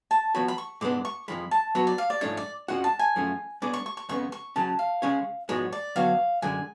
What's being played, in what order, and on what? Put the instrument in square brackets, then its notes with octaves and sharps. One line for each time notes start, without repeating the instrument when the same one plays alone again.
[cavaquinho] A5
[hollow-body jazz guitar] F3 B3 F#4 C#5 [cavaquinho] B5
[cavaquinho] B5
C#6
[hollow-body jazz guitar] G#2 G#3 B3 D4 [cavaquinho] D6
[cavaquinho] C#6
[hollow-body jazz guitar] F2 F3 G#3 [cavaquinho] B5
[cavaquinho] A5
[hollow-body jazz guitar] F#3 B3 F#4 B4 [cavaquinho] C#5
[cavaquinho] D5
F5
D5
[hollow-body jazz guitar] G#2 F3 A3 D4 [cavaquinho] C#5
[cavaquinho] D5
[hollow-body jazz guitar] F2 F3 G#3 C#4 F#4 [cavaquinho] F#5
[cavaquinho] A5
G#5
[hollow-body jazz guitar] F#2 F3 A3 C#4 G#4
[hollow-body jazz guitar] G#3 B3 D4 G#4 C#5 [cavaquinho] D6
[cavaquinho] C#6
C#6
C#6
[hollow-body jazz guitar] F2 C#3 G#3 B3 [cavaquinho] C#6
[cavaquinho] C#6
[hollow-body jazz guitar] C#3 F#3 C#4 [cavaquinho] A5
[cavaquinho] F5
[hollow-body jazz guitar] C#3 G#3 C#4 G#4 C#5
[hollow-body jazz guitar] G#2 F3 G#3 B3 F#4 [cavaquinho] C#5
[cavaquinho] D5
[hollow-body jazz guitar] D3 F#3 B3 F#4 C#5 [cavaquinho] F5
[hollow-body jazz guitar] F#2 D3 G#3 [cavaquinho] G#5